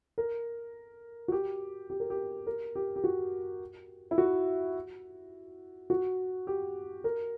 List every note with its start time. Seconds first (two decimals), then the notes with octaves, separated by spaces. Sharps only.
0.18 A#4
1.28 F#4
1.32 G4
1.90 G4
2.00 A#4
2.10 G4
2.47 A#4
2.76 G4
2.96 G4
3.04 F#4
4.11 E4
4.18 F#4
5.90 F#4
6.47 G4
7.04 A#4